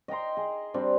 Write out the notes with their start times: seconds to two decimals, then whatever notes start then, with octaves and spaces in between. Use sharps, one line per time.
0.08 D#5 G5 A#5 C6
0.37 G#4
0.74 G3 C4 D4